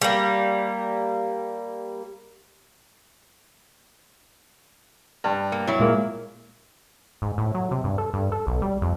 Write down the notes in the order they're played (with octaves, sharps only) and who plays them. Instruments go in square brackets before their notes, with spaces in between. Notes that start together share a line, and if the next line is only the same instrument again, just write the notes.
[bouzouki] G3 A#3
[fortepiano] G2
[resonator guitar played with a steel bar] A#3
F#3 E4
[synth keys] A#2 G#3 A#3
[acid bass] G#2
A2
F#3
C3
G2
A4
G2
A4
B1
G3
F2